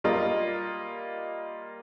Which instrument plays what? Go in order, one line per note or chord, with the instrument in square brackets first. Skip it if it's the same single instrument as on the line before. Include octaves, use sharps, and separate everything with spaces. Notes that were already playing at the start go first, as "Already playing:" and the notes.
[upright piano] G3 A#3 F4 A#4 D#5